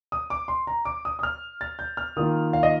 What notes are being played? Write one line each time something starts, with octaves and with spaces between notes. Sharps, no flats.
D#6
D6
C6
A#5
D6
D#6
D#6
F6
A6
G6
F6
D#3 A#3 F4 D#6
F5
D#5